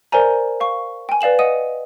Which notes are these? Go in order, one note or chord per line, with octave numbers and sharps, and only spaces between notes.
A#4 C5 D5 G#5 A#5
F5 C#6
G5 G#5
B4 D5 F5 E7 F#7
D#5 F#5 D#6 D#7